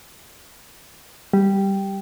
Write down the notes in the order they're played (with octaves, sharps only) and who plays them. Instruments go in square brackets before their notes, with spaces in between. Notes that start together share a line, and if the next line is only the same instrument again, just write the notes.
[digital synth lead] G3